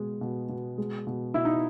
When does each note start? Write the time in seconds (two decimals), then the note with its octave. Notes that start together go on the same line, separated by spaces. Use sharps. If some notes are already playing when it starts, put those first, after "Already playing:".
Already playing: B2 G#3
0.21 B2
0.49 B2
0.78 G#3
1.07 B2
1.34 B2 E4
1.45 D#4